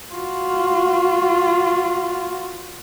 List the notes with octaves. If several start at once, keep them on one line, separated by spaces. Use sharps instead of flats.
F4 F#4